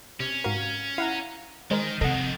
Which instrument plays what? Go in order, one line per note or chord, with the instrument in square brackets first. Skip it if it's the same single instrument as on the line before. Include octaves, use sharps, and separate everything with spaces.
[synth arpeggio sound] C3 [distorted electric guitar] C#4
[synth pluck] G#2 F#4 A#4 [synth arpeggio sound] F5
[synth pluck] E4 [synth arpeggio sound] F5 F#5 A#5
[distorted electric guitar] D#3 [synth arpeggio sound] G#3 [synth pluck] A#4 C5
[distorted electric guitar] F2 D#3 [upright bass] C3 [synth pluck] A4 [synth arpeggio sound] D#5 F#5